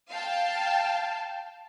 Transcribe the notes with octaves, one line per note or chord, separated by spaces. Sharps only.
F5 G5 A5